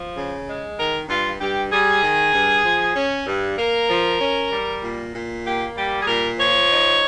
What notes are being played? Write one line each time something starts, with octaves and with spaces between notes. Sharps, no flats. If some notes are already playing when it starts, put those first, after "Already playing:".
Already playing: F3
C#3
G#3
D#3 A#4
G2 F4
G2 G4
G3 G#4
D#3
G2
F3
C#4
G2
A#3 A#4
F3
C#4
G3
A#2
A#2
A#3 G4
G3 G4
G#4
A#2 A#4
F3 C#5
D#4